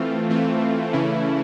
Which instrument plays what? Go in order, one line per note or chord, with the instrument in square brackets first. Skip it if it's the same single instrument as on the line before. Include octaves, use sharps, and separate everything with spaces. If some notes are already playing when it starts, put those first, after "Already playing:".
Already playing: [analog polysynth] E3 A3 C4 F4
E3 A3 C4 F4
C#3 E3 A3 C#4 E4